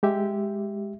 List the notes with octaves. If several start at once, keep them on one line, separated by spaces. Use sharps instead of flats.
G#3 G4 E5